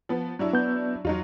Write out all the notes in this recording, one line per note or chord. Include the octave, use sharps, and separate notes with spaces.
F3 B3
F#3 D4 E4
B3 G6
E2 F#3 D#4 F4